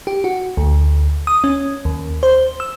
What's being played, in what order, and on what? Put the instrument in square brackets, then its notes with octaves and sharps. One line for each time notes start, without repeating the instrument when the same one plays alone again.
[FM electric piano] G4
F#4
D2
D#6
C#4
D#2
C5
E6